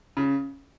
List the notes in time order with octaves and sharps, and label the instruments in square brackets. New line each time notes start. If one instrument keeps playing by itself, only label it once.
[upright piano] C#3